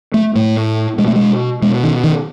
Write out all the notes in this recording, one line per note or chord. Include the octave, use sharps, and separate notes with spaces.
A3
A2 A3
B2 G#3
A3
G#3
B2 G#3
D#3
D#3